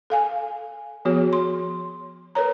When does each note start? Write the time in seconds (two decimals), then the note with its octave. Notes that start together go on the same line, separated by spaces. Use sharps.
0.10 A4 F5 G#5
1.05 F3 B3 F#4 G#4 C#5
1.33 C6
2.35 A#4 B4 C#5 A#5